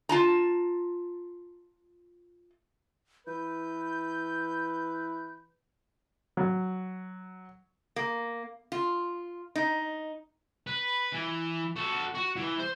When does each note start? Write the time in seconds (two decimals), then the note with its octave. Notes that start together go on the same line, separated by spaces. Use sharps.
0.09 F4 A5 A#5
3.27 E3 B4 G6
6.37 F#3
7.96 A#3
8.72 F4
9.55 D#4
10.67 B4
11.13 E3
11.76 F#4 A4
12.14 F#4
12.36 E3
12.59 C5